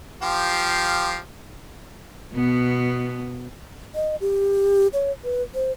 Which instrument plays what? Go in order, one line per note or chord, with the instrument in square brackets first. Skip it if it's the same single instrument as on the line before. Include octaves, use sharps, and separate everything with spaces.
[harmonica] F3 G4 F5
[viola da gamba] B2 B3
[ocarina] D#5
G4
C#5
B4
C5